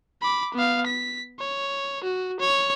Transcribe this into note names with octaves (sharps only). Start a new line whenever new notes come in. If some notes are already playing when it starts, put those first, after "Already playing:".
B5 D6
B3 F5
B6
C#5
F#4
C#5